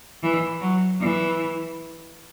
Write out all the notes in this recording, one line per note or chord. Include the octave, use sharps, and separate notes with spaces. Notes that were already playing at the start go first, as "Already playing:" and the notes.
E3
F#3
E3